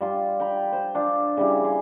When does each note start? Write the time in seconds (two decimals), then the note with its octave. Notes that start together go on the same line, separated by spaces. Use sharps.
0.01 G3 F4 C6
0.40 G5 A#5 B5
0.72 C5
0.95 D4 F4
1.37 C#3 G3 E4
1.63 G#4 C6